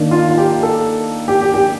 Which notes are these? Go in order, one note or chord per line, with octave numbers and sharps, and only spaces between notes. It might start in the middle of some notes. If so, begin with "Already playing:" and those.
Already playing: D#3 A#3 D4
F4
F4
G4
A4
G4
G4
G4